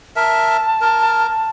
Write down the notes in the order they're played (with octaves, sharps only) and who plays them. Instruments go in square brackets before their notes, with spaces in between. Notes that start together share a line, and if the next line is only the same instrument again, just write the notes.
[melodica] A#4 E5 [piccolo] A5
[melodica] A#4